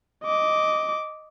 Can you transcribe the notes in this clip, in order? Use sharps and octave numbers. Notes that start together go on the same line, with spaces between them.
D#5 D6